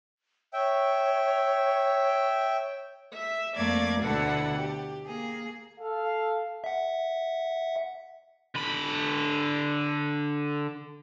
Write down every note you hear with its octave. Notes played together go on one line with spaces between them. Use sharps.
C#5 E5 G5
E5
F2 A3 A#3 D5 D6 G#6
D2 B2 D3 E4 A4 F#5
G4
A#3 G#4
A4 F5
E5 F#5
D3 B5